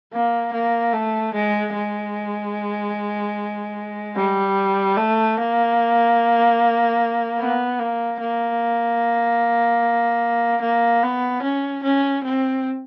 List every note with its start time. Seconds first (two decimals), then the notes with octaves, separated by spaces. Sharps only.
0.13 A#3
0.53 A#3
0.94 A3
1.34 G#3
1.74 G#3
4.16 G3
4.97 A3
5.37 A#3
7.39 B3
7.79 A#3
8.20 A#3
10.61 A#3
11.03 B3
11.42 C#4
11.83 C#4
12.23 C4